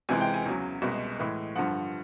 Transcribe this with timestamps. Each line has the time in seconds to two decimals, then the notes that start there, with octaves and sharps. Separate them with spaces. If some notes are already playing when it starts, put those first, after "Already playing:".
0.09 C#2 C3 E3 G#3 G#5
0.21 G5
0.34 G#5
0.45 E2 C#3 F#3
0.82 C2 B2 G#3
1.19 A2 E3 G#3
1.56 G2 D3 F3 F#5